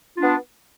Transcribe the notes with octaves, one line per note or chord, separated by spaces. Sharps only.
B3 D4 F4